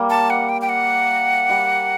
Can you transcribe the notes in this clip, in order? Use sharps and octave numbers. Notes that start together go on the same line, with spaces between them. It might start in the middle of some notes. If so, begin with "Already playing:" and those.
Already playing: G3 A#3
A5
F#5
G5
G5
F#5
G3